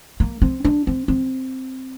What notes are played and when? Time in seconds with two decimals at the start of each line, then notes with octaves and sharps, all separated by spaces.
0.20 A#3
0.42 C4
0.64 D4
0.87 C4
1.08 C4